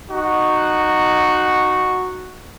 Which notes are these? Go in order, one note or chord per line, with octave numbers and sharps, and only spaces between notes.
D#4 F#4